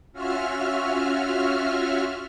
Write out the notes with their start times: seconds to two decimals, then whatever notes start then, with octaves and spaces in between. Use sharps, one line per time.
0.12 C#4 F4 F#4 E5 F6